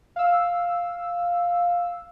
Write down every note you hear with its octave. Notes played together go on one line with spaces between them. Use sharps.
F5 E6